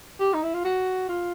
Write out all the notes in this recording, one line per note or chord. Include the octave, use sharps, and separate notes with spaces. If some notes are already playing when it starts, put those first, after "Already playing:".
G4
D#4
E4
F4
F#4
F4